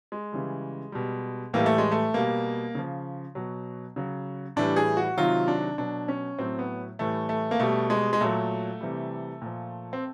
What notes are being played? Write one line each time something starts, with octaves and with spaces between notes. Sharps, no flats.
G#3
C#3 E3 G3
B2 G3
A2 E3 G3 A#3
A3
G#3
A3
B2 G3 A#3
C#3 F3
B2 F#3
C#3 F#3
A2 E3 G3 D4
G#4
F#4
C3 D#3 F#3 F4
D4
B2 F#3 D4
C#4
A2 F#3 C4
B3
A2 E3 G3 A3
A3
A#3
B2 G3 A3
G#3
G#3
A#2 F#3 A3
C3 E3 G3
A#2 F3
C4